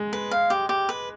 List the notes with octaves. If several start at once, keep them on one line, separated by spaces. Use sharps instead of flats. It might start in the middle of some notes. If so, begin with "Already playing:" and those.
Already playing: G#3
B4
F5
G4
G4
B4